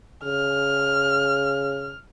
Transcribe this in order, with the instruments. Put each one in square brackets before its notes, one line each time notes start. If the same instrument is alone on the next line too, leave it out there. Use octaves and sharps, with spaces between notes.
[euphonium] C#3 [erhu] F6